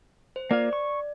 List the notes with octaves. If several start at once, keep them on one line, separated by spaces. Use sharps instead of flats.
C5
A#3 F4 D5 F5
C#6